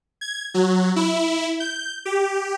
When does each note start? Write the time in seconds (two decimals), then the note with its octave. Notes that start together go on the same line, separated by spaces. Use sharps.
0.21 G#6
0.54 F#3
0.96 E4
1.60 G6
2.05 G4